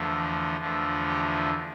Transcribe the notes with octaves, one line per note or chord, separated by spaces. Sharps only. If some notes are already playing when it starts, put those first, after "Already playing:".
Already playing: E2 D3 F3 A3
E2 D3 F3 A3
G4